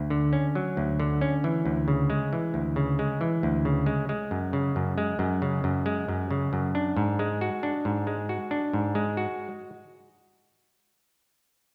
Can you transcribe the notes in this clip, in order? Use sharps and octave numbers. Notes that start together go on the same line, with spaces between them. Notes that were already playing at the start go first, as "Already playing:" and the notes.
Already playing: D2
D3
C#4
F#3
D2
D3
C#4
E3
D2
C#3
G#3
E3
D2
C#3
G#3
E3
D2
C#3
G#3
G#3
F#2
C#3
F#2
G#3
F#2
C#3
F#2
G#3
F#2
C#3
F#2
D4
G#2
G#3
F#4
D4
G#2
G#3
F#4
D4
G#2
G#3
F#4